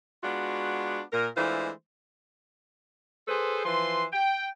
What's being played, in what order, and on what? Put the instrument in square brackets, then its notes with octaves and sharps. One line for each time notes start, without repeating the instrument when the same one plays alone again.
[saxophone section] G#3 B3 D4 F4 F#4
A#2 A#4
E3 G#3 A3 D4 F4 C5
[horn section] G#4 A4 B4 C5
E3 F3 B4 C6
G5